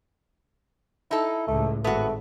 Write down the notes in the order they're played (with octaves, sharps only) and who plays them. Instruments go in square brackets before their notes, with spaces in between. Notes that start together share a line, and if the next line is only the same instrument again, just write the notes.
[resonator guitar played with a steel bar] D#4 A4 [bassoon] E4
[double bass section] C#2 A2 [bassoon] A3
[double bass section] G#1 [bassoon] A3 [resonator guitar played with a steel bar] B3 F#4